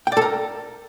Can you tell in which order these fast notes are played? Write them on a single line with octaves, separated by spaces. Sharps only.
G5 D5 A4 A#4